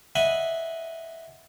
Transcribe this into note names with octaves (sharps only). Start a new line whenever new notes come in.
D#5 E5 F#5 G#5 B5 C6